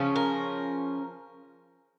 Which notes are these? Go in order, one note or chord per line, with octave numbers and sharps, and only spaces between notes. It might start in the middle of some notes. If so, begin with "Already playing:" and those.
Already playing: C#3 F3 C#4
A#4